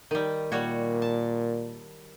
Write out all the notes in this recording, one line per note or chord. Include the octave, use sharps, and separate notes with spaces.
D#3 G3
A#2 G3 F#4 C#5
A5